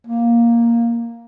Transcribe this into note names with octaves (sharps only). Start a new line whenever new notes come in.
A#3